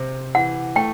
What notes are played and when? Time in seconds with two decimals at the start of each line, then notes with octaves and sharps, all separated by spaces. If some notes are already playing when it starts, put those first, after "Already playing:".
Already playing: C3 C4
0.35 E3 F#5
0.75 A3 G5